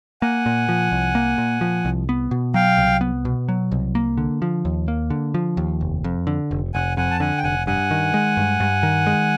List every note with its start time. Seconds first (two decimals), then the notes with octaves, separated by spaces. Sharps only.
0.22 A#3 F#5 G#5
0.46 A#2
0.69 F3
0.92 C2
1.15 A#3
1.38 A#2
1.61 F3
1.85 C2
2.09 B3
2.31 B2
2.54 F#3 F5 G5
2.78 C2
3.01 B3
3.25 B2
3.48 F#3
3.71 C2
3.95 A#3
4.17 D3
4.42 F3
4.65 D#2
4.88 A#3
5.10 D3
5.34 F3
5.57 D#2
5.81 F1
6.04 F2
6.27 D3
6.51 F1
6.74 F1 F#5 G#5
6.97 F2 F#5 G#5
7.11 A5
7.20 D3 F#5 G#5
7.38 G5
7.43 F1 F#5 G#5
7.67 G2 F#5 G#5
7.91 D#3
8.14 G#3
8.37 G2
8.60 G2
8.83 D#3
9.07 G#3